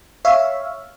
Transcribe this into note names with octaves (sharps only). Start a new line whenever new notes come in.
C#5 E5 F5